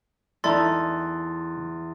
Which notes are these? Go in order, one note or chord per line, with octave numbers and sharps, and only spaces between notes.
E2 D#4 E4 A4 D5 C6 A6